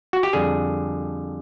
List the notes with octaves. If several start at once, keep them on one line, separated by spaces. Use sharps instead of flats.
F#4
G4
F2 D3 G3 G#4